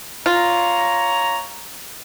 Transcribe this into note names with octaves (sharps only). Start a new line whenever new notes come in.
F4 C#5 A#5